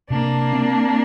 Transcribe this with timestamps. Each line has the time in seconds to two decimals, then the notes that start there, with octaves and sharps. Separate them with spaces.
0.10 C3 A#3 D4
0.53 C4